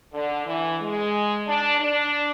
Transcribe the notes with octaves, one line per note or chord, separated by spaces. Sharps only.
D3
E3
G#3
D4
D4